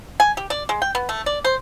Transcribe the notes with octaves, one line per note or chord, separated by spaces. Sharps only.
G#5
G4
D5
G#3
G5
B3
A3
D5
C5